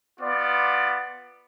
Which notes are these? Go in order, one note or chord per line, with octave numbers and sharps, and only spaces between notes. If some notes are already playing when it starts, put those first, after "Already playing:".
B3 F4 D5